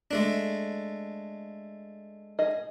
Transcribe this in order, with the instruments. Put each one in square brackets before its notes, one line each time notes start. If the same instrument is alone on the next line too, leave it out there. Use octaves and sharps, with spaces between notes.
[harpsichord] G#3 A3 D4
[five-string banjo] G#4 D#5